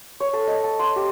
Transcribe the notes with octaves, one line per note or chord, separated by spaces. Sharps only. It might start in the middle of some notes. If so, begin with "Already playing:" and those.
C#5
A4
D#5
A5
C6
G4